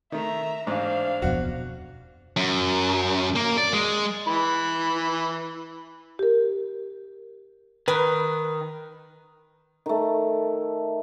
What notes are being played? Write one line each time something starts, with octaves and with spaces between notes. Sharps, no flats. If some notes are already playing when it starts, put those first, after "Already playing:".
D#3 A3 E5 A#5
A1 G#2 D4 C5 F5
D1 F2 B2 F#4
F#2
A#3
D5
G#3
E3 B5
G4 A#4
D#3 B4
D#3 A3